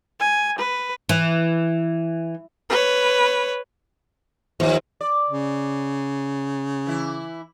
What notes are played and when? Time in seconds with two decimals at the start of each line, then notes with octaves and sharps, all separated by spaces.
0.20 G#5
0.58 B4
1.09 E3
2.70 B4 C#5
4.60 D#2 F3
5.01 D5
5.30 C#3
6.87 E3 E4